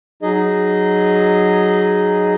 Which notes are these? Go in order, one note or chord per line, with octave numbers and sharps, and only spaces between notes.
F#3 D#4 G#4 D#5